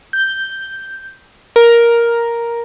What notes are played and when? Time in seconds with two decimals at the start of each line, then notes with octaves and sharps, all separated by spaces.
0.13 G6
1.56 A#4